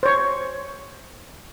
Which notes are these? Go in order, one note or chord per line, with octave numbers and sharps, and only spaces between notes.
C5 C#5